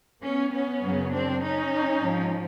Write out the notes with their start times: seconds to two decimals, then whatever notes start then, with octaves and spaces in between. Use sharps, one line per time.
0.22 B3 C#4
0.51 B3 C#4
0.81 F#2 C#3 F#3
1.11 C4 D4
1.40 C#4 D#4
1.99 G#2 F3